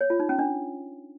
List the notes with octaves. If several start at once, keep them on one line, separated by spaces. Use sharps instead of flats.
C#5
F4
D#4
C#4
D4